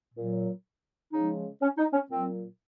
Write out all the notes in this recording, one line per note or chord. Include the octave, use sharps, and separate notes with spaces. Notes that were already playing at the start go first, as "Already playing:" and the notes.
A#2 F#3
C#3 F3 G#3 D#4
C#4
D#4
C#4
A#2 F#3 C4